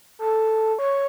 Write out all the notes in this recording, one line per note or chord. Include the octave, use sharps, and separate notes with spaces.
A4
C#5